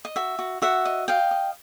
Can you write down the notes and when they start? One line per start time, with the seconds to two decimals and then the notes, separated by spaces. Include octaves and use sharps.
0.05 D#5
0.16 F#4 E5
0.39 F#4
0.62 F#4 E5 F#5
0.85 D#5
1.08 D#5 F5 G5
1.31 D#5